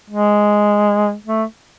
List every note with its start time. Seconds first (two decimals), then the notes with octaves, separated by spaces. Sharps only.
0.10 G#3
1.26 A3